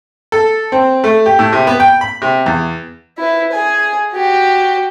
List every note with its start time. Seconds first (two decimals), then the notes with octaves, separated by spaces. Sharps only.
0.32 A4
0.72 C4
1.04 A3
1.26 G4
1.39 A2
1.53 C3
1.67 B3
1.80 G5
2.01 B5
2.22 C3
2.46 E2
3.18 E4 B4
3.52 G#4 G#5
4.12 F#4 G4